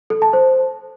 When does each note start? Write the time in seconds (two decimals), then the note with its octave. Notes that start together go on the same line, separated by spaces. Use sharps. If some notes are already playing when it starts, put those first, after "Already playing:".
0.10 A4
0.22 A5
0.33 C5